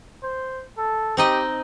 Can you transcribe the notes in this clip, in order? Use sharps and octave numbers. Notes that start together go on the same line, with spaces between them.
C5
A4
C4 D#4 G4 D#5